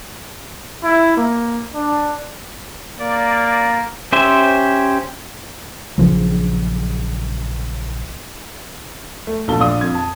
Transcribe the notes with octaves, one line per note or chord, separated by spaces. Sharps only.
E4
A#3
D4
A#3 D5
C#4 G4 C5 E5
A#1 C#3 F3 F#3
A3
A#1 B2 A3 A5 G7
A#1 D4 F5 D#6
F2 G#6
A5